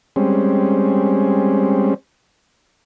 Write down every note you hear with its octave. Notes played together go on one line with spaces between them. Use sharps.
G3 G#3 C4 C#4